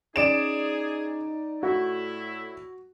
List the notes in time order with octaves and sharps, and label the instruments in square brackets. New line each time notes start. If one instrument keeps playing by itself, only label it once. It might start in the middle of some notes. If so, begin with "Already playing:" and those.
[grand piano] C#4 [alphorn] D#4 [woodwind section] G#4 [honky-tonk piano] D5 D7 E7
[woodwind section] A2 A3 E4 [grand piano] F#4